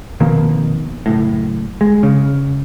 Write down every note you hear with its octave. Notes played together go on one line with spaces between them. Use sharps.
F2 B2 D#3 A#3
F#1 A2
G#3
C#3